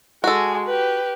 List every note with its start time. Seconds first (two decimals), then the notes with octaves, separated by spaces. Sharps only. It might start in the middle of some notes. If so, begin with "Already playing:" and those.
0.24 G#3 F#4 A4 G#5
0.65 G4 B4